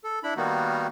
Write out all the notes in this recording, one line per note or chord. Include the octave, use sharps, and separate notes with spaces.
A4
D4 E4 B5
D#3 G3 A#3 B3 D#4 F#4